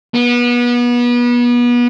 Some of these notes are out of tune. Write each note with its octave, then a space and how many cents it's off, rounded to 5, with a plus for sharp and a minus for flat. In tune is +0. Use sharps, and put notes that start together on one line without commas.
B3 -30